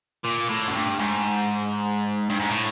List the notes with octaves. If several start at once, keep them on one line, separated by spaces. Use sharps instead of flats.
A#2
A2
F#2
G2
G#2
G2
G#2
A2